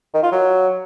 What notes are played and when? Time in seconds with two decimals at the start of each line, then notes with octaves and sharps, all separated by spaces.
0.14 D#3
0.23 F4
0.32 F#3